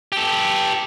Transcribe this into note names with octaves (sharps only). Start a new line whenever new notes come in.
G4 A4